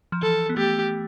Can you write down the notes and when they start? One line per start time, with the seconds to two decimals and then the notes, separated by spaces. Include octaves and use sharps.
0.12 F3
0.22 E3 A4
0.49 B3
0.57 A3 G4